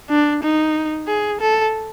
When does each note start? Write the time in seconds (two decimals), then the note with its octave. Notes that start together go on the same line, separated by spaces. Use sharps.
0.10 D4
0.43 D#4
1.07 G#4
1.40 A4